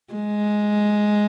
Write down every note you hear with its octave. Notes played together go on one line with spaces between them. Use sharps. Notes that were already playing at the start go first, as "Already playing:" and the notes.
G#3